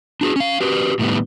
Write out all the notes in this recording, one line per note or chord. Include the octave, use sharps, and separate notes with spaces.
D4 F#4 G#4
C#4 F5
F#4 G4 B4
A2 D#3 G3 B3